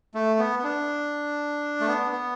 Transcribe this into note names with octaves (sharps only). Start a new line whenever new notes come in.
A3
B3
B3
D4
A3
B3
B3